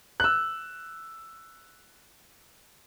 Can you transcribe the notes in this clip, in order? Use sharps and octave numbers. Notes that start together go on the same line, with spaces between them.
E6 F#6